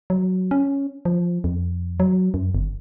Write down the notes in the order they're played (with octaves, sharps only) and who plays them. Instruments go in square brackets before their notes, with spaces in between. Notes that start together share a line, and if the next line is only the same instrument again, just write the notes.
[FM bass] F#3
C#4
F3
F2
F#3
F#2
G1